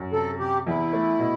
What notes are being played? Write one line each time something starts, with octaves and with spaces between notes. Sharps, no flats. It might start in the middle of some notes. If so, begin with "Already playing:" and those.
Already playing: F#2
C3 A4
C3 G4
E2 E4
A3
B2